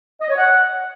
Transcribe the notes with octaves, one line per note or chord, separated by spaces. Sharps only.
D#5
C#5
F#5